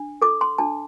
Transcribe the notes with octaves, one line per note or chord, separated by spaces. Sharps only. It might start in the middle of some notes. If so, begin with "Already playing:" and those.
Already playing: D4
A4 D6
C6
D4 A5